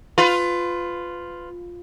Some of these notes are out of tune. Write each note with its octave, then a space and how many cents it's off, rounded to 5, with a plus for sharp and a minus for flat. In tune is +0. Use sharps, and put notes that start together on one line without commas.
F4 +5 B4 +25